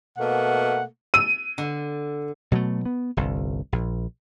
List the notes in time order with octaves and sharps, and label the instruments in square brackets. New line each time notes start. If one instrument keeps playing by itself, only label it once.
[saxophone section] B2 A3 A#3 [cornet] F#5
[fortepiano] E6 [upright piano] D#7
[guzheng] D3
[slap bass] B2 F#3 G#3 A3
B3
G1 C2
A#1